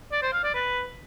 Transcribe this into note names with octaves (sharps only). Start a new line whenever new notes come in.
D5
C5
F5
D5
B4